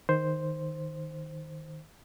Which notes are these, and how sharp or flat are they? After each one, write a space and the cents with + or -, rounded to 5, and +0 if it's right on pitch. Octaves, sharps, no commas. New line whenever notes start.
D#3 +0 C5 +0